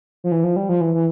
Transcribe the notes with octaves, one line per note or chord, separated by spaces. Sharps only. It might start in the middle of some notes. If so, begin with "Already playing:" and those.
F3
E3
F3
G3
F3
E3
E3